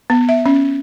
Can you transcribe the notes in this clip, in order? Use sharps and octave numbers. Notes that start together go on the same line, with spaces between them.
B3
E5
C#4